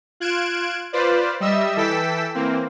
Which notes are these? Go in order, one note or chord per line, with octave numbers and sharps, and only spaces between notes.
F4 F#6 G#6 D7 E7
F4 B4 C5 D5
G3 D#5 E5 E6
E3 A4 G5 E6 B6
E3 A#3 C4